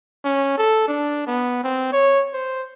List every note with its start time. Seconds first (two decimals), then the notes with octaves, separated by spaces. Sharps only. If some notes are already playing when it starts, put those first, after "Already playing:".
0.25 C#4
0.58 A4
0.88 D4
1.27 B3
1.63 C4
1.93 C#5
2.33 C5